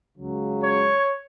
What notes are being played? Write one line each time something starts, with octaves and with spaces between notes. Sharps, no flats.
C#2 C#3 F#3
C#5